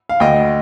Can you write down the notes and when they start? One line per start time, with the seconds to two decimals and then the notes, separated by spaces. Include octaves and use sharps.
0.09 F5
0.20 D2 D#5 G5